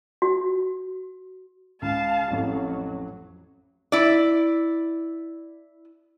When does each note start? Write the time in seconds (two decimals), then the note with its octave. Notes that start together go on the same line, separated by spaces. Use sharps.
0.22 F#4
1.82 C#2 F5 A5
2.31 A1 F2 F#3
3.92 E4 D5